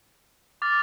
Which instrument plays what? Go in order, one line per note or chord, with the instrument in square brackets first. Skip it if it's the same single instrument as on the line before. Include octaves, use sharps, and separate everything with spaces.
[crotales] D6 F6 A6